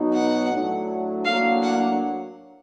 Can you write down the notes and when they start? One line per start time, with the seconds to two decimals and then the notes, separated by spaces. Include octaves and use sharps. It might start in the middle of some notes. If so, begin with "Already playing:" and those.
Already playing: B2 F#3 B3 D#4
0.14 F#5
0.51 A2 F#3 A3 D4
1.25 A2 F#3 A#3 D4 F5
1.63 F#5